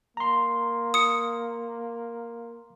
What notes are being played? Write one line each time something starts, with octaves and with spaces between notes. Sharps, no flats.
A#3 A#5 C6
D#6 C#7